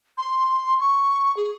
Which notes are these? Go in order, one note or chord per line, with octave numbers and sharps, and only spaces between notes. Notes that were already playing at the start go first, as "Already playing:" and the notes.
C6
C#6
G#4